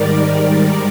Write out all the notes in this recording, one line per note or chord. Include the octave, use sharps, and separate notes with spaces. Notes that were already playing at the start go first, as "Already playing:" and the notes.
Already playing: G#2 D#3 G3 A#4 D5